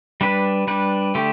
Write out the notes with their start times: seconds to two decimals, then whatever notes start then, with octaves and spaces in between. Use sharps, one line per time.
0.21 G3 D4 B4
0.67 G3 D4 B4
1.15 D3 A3 G4